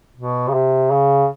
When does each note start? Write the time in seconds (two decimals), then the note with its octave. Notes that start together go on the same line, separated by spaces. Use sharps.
0.17 B2
0.48 C#3
0.54 C3
0.91 C#3